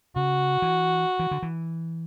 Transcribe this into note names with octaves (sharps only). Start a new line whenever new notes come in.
C#3 F#4
E3
E3
D3
E3